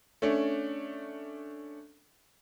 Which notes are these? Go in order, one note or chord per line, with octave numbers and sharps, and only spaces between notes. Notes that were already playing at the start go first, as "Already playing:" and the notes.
A3 C#4 D4